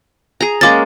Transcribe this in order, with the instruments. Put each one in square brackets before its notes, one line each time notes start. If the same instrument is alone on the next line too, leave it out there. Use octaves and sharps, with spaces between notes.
[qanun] G#4 A#5
[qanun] G#3 A#3 C#4 [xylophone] D6 A6